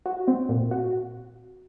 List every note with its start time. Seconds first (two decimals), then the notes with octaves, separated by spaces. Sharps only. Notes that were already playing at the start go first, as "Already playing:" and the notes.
0.06 F#4
0.28 C4
0.49 A#2
0.71 F#4